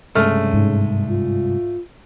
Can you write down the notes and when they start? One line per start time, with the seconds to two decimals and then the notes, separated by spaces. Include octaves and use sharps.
0.15 C2 G2 C#3 G#3 A3 F6
0.53 G#2
1.10 F4